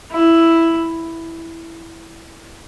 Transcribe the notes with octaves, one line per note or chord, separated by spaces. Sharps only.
E4